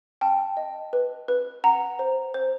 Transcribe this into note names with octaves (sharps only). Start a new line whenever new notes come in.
G5 A5
D#5
B4
B4
F#5 A#5
C5
C5